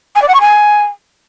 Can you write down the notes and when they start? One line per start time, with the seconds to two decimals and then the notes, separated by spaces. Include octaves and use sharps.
0.15 G#5
0.22 D5
0.28 F#5
0.34 C#6
0.41 G#5